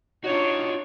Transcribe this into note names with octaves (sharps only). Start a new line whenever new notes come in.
D4 D#4 F4 F#4 C#5